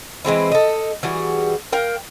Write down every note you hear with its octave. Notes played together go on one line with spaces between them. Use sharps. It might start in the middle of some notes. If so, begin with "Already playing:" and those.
E3 G#3 C4 E4
A4 D#5
E3 G3 F#4 G#4
A#4 F5 G5